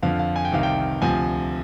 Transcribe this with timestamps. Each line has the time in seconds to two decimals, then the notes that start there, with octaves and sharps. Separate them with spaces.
0.03 F2 D3 F3 F5
0.19 F5
0.36 G#5
0.45 G5
0.52 C2 C3 D#3 F5
0.63 G5
1.02 D2 C3 F3 G#5